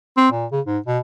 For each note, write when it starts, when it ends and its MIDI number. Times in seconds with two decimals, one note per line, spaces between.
0.17 0.30 60
0.31 0.46 46
0.52 0.61 49
0.67 0.78 44
0.86 0.99 47